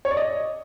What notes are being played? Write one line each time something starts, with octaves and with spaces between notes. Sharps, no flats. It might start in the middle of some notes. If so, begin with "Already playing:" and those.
C#5
D5
D#5